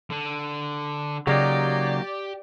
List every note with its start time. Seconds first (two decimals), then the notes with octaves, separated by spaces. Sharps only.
0.10 D3
1.27 C#3 F#3 A#3 D#4 G4 D5 G5